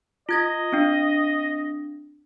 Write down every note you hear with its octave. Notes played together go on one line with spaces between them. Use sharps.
F4 D#5 G#6 A#6
C4 D4